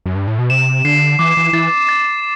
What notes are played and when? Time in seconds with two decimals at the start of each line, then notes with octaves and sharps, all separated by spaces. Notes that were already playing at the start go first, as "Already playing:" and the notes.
0.06 F#2
0.16 G2
0.27 A2
0.39 B2
0.50 C3 E7
0.85 D3 C7
1.19 E3 D6
1.37 E3
1.53 E3 A6
1.89 A6